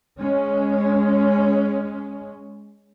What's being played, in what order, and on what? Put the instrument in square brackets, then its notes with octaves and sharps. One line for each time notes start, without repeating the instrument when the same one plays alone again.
[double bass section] G#3 C#4